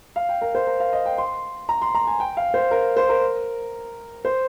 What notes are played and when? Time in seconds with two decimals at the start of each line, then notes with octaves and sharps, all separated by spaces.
0.16 F5
0.29 G5
0.41 A#4
0.55 C5
0.67 A#4
0.80 F5
0.93 D#5
1.05 G5
1.18 C6
1.69 A#5
1.82 C6
1.95 A#5
2.07 G#5
2.20 G5
2.37 F5
2.54 C5
2.71 A#4
2.97 C5
3.09 A#4
4.25 C5